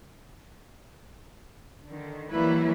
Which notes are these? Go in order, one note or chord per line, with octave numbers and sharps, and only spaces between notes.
D3 D#3
E3 F#3 G3 A#3 E4 B4